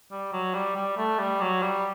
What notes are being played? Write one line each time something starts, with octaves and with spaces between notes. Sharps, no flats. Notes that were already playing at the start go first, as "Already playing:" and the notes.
G3
F#3
G3
G3
A3
G3
F#3
G3